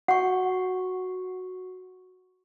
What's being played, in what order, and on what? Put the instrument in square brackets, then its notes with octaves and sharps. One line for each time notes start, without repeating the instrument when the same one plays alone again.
[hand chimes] F#4 C#6 [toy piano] F#5